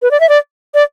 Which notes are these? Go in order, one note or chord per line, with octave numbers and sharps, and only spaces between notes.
B4
D5
E5
D5
D5